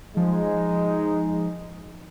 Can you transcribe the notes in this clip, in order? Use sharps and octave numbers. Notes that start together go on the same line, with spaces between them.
F3 G#3 D#4